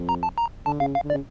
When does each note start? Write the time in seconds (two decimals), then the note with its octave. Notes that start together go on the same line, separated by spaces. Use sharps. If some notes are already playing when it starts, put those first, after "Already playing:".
Already playing: F2
0.09 A#5
0.23 A5
0.38 A#5
0.66 D3 A5
0.80 C#3 F5
0.95 F5
1.04 D3
1.10 D5
1.14 C#3